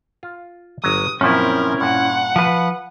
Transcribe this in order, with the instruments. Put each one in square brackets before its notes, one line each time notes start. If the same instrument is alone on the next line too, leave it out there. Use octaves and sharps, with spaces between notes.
[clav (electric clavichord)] F4
[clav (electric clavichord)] G1 F#3 [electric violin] D#6
[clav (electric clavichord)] F#2 A#2 F3 [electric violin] C4 A#4 [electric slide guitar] C#4 E4
[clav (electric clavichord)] G2 A#2 [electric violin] F#5
[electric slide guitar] F3 B4